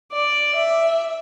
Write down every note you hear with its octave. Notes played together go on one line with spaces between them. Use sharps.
D5
E5